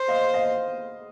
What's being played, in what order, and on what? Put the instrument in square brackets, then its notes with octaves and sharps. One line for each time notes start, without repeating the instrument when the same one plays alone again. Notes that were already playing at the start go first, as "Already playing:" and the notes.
Already playing: [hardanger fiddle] C5
[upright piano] D#5 F5
D#5 F5